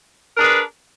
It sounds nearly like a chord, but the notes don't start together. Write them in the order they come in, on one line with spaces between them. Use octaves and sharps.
A#4 D4 G#4 B4